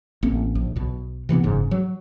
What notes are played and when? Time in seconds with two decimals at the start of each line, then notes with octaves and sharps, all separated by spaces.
0.23 A1 A#3 C4
0.55 A#1
0.76 B1 B2
1.29 C3 E3 F#3 B3
1.43 F#1 G#2 C#3
1.71 F#3